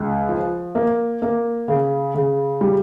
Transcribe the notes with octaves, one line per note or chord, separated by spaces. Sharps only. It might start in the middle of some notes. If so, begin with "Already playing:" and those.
Already playing: C#2
F3
A#3
A#3
C#3
C#3
G3